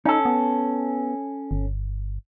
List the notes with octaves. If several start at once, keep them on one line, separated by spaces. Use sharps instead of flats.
C#4 D#4 A4
B3
G1